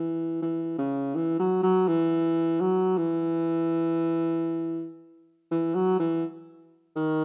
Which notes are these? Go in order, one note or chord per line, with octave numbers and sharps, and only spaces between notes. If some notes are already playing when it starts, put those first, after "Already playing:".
Already playing: E3
E3
C#3
E3
F#3
F#3
E3
F#3
E3
E3
F#3
E3
D#3